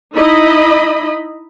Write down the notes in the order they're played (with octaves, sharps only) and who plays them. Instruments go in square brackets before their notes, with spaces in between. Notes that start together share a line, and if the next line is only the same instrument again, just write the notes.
[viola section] D#4 E4 D#5 B5